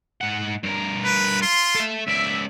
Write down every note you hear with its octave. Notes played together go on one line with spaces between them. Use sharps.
G#2 F#5
G2 A#4
B4
F4 C6
A4 E5
C#2 D5 E5